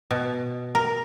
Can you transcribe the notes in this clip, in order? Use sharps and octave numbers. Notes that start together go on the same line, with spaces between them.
B2
A#4